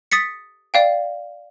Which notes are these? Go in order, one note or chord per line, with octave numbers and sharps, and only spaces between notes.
D#6 A6 B6 C#7
D5 F5 G5